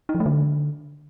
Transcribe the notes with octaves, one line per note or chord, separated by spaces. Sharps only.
D#4
F3
A3
D3